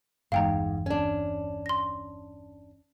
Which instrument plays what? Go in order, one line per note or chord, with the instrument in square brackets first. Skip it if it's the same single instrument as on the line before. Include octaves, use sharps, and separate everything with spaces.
[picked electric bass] G1 E2 [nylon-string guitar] G#2 [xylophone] F5 G5 A#5
[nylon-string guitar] C#4 D4
[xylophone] C6 A#6